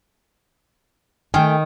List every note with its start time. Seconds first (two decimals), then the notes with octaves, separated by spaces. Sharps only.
1.34 D#3 A3 G5 G#5